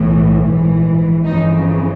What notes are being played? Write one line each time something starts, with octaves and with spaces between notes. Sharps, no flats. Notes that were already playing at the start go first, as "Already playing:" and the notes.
Already playing: B1 A2 E3
A#1 G#2 E3
G1 F2 C#3 E3 D#4